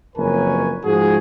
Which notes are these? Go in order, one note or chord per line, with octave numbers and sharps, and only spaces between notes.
F#1 F2 A#4 B4 C#5 G#5
G#2 F3 F#4 G#4